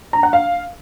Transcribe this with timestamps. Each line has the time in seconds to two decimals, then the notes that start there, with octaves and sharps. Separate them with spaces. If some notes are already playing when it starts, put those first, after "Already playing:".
0.13 A#5
0.23 F#5
0.33 F5